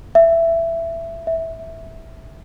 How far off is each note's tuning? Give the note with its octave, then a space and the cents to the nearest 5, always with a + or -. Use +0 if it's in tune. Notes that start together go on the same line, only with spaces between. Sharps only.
E5 +15
E5 -10